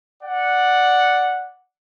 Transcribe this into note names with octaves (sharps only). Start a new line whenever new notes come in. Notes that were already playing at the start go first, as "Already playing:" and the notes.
D5 F#5